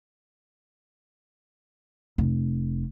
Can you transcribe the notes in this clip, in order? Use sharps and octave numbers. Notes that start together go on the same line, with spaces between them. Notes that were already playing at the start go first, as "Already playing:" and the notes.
F1